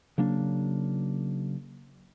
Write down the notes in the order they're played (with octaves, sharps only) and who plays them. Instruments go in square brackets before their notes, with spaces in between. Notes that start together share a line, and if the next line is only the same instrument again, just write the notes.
[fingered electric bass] C#3 F#3 A#3 D4